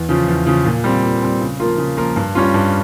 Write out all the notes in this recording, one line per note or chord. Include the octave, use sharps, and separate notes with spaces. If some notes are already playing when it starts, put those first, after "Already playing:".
Already playing: E2
C#3 F3
E2
C#3 F3
A#2
G3 C4
A#2
G3 C4
C#3
F3 A#3 F4 A#4
C#3
F3 A#3 F4 A#4
G2
G3 C#4 F4
G2